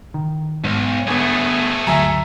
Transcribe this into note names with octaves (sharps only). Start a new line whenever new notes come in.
D#3
B1 G#2
G1 A3 B3 G#4
G1 D2 F#3 E5 G#5 A#5